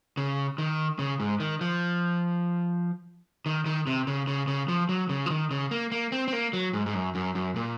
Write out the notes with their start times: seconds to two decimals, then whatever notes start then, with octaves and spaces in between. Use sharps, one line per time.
0.17 C#3
0.58 D#3
0.99 C#3
1.20 G#2
1.40 D#3
1.61 F3
3.46 D#3
3.66 D#3
3.87 C3
4.07 C#3
4.27 C#3
4.48 C#3
4.68 F3
4.89 F#3
5.09 C#3
5.26 F3
5.30 D#3
5.51 C#3
5.71 A#3
5.92 A#3
6.12 C4
6.28 C4
6.33 A#3
6.53 F#3
6.73 G#2
6.86 G#2
6.94 F#2
7.15 F#2
7.35 F#2
7.56 A#2